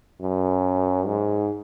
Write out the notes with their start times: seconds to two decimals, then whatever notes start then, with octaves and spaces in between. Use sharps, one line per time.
0.21 F#2
1.07 G#2